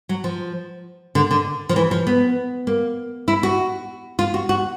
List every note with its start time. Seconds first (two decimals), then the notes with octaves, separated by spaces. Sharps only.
0.09 F#3
0.24 F3
1.15 D3
1.31 D3
1.69 F3
1.76 E3
1.91 F3
2.07 B3
2.67 A#3
3.28 E4
3.43 F#4
4.19 F4
4.34 F#4
4.49 F#4